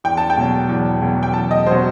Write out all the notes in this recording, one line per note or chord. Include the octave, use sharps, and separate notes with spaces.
E2 G5
A5
G5
B2 F#3
E2
B2 F#3
G5
E2 A5
D#5
B2 F#3 C5